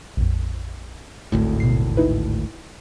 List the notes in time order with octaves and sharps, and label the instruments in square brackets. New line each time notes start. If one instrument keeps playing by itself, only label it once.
[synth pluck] A#1 F2
[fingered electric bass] G#1 D2 A2 [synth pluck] A3
[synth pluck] B2 C7
D#4 E4 B4